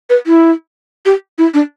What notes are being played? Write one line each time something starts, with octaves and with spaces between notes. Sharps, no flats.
B4
E4
G4
E4
D4